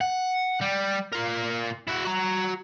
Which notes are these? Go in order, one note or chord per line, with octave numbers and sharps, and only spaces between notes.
F#5
G3
F4 A#4
E4 F#4
F#4 A#5